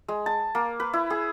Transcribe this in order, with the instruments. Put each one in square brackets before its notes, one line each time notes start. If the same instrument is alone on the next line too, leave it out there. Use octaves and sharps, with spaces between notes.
[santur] G#3
A5
A#3
B4
E4
G#4